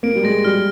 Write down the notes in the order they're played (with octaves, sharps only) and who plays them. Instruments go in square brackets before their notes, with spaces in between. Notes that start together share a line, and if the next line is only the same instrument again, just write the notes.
[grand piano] A#3 [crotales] D7
[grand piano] G3
[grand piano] G#3 [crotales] A#6
[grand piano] G3 [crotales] F6